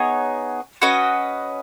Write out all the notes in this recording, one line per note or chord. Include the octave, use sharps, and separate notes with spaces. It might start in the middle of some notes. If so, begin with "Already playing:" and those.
Already playing: B3 D#4 G#4 C#5
C#4 F#4 B4 D#5